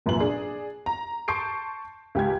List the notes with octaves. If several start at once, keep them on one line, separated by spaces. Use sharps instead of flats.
F1 F#2 A#2 F3 B4 F#7
D4 G#4
A#5
A5 C6 C#6 G6 C7 D7
C#2 G4 G#5 G#6